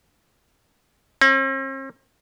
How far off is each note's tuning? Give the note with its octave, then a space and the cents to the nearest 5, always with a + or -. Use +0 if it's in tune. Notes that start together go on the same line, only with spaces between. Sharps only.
C4 +45